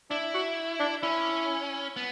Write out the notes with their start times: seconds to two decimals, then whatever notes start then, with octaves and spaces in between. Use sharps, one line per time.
0.10 D4 E4
0.34 F#4
0.80 D4
1.03 C#4 E4
1.97 B3